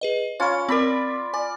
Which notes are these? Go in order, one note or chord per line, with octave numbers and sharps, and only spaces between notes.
G#4 B4 D#5
C#4 F4 C#5 F5 B5
C4 A#4 D5 B5 D6
D5 G#5